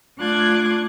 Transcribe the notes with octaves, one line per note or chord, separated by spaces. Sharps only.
A3 D4 F4 D6 F#6 G#6